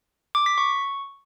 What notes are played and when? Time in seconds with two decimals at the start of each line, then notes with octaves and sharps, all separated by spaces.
0.35 D6
0.46 B6
0.58 C#6